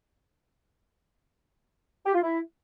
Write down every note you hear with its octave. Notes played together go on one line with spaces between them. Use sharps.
G4
F4
E4